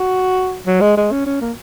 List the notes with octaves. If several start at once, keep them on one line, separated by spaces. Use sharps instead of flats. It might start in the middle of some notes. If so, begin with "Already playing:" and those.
Already playing: F#4
F#3
G#3
G#3
C#4
C#4
A#3